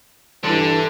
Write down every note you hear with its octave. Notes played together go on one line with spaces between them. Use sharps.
G2 D3 E3